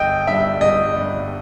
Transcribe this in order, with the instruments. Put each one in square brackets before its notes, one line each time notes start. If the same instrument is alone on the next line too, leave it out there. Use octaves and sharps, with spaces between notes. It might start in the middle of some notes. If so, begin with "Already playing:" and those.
Already playing: [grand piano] G1 [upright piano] D#5 G5
[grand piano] G2 G3 [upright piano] E5
[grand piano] G1 [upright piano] D#5
[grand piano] G2 G3